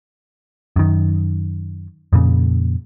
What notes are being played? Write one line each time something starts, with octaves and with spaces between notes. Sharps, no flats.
F#2 D#3
F2 A#2 C#3